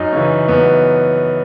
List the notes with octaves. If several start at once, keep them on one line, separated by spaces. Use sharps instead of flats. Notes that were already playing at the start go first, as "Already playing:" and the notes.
Already playing: F#2 D#4
C#3 E3 C#4
F#2 B3